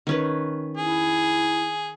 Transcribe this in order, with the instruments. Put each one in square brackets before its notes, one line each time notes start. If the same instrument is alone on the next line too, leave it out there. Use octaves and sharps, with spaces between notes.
[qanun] D#3 C#4 B4
[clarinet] E4 [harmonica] G#4